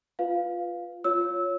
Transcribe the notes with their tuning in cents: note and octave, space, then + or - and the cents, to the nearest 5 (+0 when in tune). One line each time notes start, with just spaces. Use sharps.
F4 +0 B4 +0 F5 +0
F4 +0 C#5 +0 E6 -20